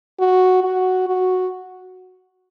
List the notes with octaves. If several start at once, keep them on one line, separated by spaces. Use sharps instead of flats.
F#4
F#4
F#4